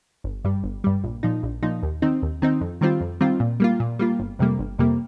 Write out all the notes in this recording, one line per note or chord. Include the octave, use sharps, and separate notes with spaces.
G1
G2 G3
G1
G2 G3
A#1
A#2 F3 D#4
A#1
A#2 F3 D#4
D#2
D#3 C4 D#4
D#2
D#3 C4 D#4
F2
D#3 G3 C4 F4
F2
D#3 G3 C4 F4
A#2
G3 A#3 F4
A#2
G3 A#3 F4
G1
F2 C3 G3 A#3
G1
F2 C3 G3 A#3